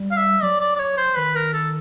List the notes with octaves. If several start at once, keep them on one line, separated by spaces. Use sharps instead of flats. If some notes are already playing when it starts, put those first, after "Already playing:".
Already playing: G3
F5
E5
F#3 D5
D5
D5
C#5
C5
D#3 B4
A#4
A4